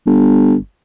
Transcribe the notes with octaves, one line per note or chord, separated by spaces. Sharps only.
G1